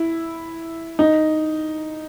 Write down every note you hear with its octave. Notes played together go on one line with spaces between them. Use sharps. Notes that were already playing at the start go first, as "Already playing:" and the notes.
Already playing: E4
D#4